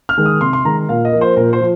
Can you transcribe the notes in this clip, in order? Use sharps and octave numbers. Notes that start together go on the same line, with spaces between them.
F6
D#3 G#3
D#6
C3 C6
C6
D#3 G#3 A#5
A#2 F5
D#5
F3 A#3
C5
A#2 A#4
C5
F3